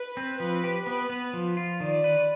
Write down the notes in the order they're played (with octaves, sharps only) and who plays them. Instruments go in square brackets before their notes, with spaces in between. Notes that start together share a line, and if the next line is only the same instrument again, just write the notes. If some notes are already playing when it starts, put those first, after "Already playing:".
Already playing: [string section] B4
[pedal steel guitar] C4
[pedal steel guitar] F3 [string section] B4
[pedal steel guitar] G4
[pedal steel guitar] B3 [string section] B4
[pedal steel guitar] B3
F3
F4
[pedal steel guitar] D#3 [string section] D5
[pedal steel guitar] B4